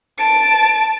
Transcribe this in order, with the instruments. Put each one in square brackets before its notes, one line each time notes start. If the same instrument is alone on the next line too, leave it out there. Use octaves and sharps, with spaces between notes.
[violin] A5 D7